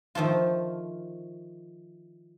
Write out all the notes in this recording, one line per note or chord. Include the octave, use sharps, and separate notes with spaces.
D#3 F3 A3 F4